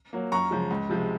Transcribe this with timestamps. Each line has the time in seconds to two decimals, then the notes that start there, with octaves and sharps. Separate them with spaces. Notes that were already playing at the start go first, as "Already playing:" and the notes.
0.13 F#3 A#3
0.32 F#2 A#5 C#6
0.51 C#3 F3 G#3
0.70 C#2
0.89 C3 F3 G#3